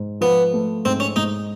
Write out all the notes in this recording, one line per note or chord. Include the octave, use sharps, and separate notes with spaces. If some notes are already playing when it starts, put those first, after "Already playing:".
Already playing: G#2
F3 B3
A3
G#2 C4
C#4
G#2 D#4